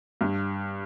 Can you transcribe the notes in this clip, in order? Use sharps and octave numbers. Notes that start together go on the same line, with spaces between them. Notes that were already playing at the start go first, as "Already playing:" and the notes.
G2